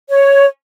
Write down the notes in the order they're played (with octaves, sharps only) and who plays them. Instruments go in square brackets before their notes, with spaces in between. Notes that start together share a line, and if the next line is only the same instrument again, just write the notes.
[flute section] C#5